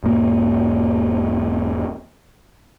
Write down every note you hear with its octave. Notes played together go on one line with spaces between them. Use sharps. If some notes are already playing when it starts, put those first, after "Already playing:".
E1 G#2 A#3